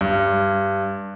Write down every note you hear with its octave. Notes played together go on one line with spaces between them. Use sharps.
G2